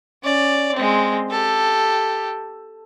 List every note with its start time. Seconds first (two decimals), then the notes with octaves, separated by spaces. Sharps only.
0.23 C#4 D5
0.74 G#3 C4
1.31 G4 A4